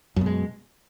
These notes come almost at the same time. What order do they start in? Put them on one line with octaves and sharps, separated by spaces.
F#2 B2 G#3